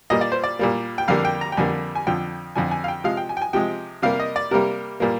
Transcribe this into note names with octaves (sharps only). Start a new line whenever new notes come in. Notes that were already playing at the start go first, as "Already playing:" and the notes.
A#2 G3 A#3 D#5
D5
C5
D5
A#2 G3 A#3
G5
F2 D3 G3 A#3 F5
G5
A#5
G5
F2 D3 G3 A#3 G#5
G#5
F2 D3 F3 G5
F2 D3 F3 G#5
G#5
F5
G5
C3 F3 G#3 F5
G5
G#5
G5
G#5
C3 F3 G#3 G5
C3 G3 A#3 F5
D#5
D5
C3 G3 A#3 A#4
A#2 G3 A#3